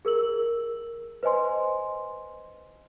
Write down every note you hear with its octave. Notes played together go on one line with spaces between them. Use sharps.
G#4 A#4 E6 F#7
B4 C5 D#5 G#5 C6